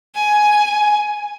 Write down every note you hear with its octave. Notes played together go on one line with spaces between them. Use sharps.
G#5